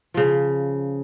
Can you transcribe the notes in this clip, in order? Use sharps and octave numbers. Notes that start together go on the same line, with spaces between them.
C#3 F3